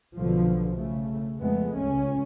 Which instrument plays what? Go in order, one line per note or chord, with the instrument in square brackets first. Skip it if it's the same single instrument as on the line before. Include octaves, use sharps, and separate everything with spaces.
[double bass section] B1 B2 D3 F3
C#3 A3
F2 G#3 A3 B3
C#2 C#4